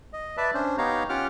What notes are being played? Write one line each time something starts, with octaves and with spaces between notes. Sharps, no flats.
D#5
B4 D5 E5 A5
C#4 D4 C5
B3 D#4 G4 C#5 F5 A#5
C#4 F4 G4 F#5 D6 F6